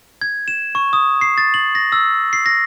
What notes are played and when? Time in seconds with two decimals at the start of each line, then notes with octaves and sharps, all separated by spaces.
0.21 G#6
0.48 E7
0.75 C#6
0.93 D#6
1.21 C7
1.38 A6
1.54 F#7
1.75 A#6
1.92 E6
2.33 C7
2.46 A#6